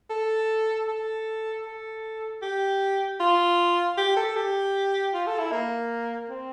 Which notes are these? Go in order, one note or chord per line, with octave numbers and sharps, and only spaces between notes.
A4
A4
A4
G4
F4
G4
A4
G4
F4
A4
E4
A#3
C4